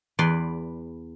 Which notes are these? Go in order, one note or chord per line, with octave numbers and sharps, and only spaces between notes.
E2 B4 D5 C6